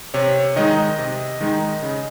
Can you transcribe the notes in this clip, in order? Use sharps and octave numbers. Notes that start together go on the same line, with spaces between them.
C3 C#5
D#3 G#3 D#4 D#5
C3
D#3 G#3 D#4
C#3 D#5